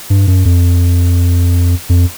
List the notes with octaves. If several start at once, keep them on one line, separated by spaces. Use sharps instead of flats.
G2
F#2
F2
F2